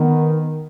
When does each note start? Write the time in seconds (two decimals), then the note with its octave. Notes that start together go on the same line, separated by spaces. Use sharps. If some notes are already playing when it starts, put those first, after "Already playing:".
Already playing: D#3 B3